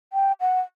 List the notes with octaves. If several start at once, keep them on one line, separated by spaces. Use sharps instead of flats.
G5
F#5